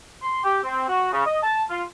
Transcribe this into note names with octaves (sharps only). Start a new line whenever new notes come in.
C6
G4
C4
F#4
C#3
D#5
A5
F4